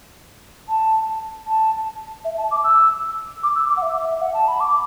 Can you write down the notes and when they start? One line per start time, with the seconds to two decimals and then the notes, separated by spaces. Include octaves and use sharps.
0.69 A5
1.47 A5
2.25 E5
2.38 A5
2.51 D6
2.64 E6
3.43 D6
3.56 E6
3.69 D6
3.77 F#5
3.82 E5
4.07 E5
4.21 F#5
4.34 A5
4.48 B5
4.60 D6